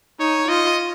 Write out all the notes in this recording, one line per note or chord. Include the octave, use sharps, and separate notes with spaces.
D#4 C#5
F4 D#5